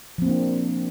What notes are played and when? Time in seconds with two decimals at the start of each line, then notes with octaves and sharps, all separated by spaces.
0.18 F3
0.22 C4
0.26 A#3
0.29 D4